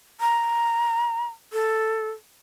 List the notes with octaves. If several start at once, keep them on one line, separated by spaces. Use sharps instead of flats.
A#5
A4